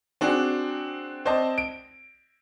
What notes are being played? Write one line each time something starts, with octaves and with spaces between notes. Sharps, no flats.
C4 D4 F#4 G#4
C4 C5 D5 D#5 A5
D7